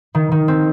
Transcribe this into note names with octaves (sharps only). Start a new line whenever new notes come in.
D#3
D#3
C4